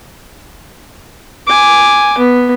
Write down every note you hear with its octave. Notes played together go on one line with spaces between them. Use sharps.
G#5 D6
B3